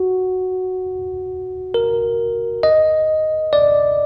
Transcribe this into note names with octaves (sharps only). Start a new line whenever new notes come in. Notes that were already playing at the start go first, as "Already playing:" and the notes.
Already playing: F#4
A#4
D#5
D5